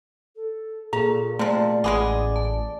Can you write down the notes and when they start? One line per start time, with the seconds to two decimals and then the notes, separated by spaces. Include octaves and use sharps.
0.36 A4
0.93 A#2 G#4 A4 A#5
1.39 C3 F3 A3 D5
1.84 A1 G#3 B3 G#4 D6
2.36 A5